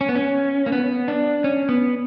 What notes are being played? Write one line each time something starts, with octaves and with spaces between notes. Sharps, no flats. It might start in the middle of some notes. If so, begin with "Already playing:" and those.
C#4
B3
C#4
A#3
B3
D4
C#4
B3